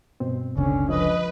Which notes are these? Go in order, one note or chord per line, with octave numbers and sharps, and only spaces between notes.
G2 B2 C4
F#1 C#2 D3 C#4
F3 B4 D#5